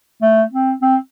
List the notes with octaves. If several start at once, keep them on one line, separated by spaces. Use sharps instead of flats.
A3
C4
C4